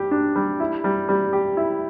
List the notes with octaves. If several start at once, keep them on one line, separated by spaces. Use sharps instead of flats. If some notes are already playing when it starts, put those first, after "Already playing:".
Already playing: G3 G4
D4
G3
E4
G3
G3
G4
E4